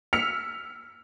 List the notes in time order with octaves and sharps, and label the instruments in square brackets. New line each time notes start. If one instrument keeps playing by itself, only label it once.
[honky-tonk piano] E6 F6 B6 C#7 F7